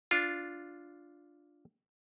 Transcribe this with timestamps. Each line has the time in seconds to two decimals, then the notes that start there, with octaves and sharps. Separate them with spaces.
0.11 D4 F4